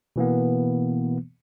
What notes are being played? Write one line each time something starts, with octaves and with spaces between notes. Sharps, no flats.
B2 E3 A#3 B3